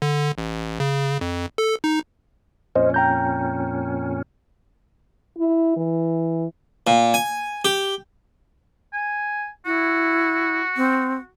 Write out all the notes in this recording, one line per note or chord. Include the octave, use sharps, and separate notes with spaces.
D3
A1
C#3
F2
A4
D#4
F2 A#2 C#4 C5 D#5
G5 A#5 G6
E4
E3
A#2
G#5
G4
G#5
E4 F#4
C4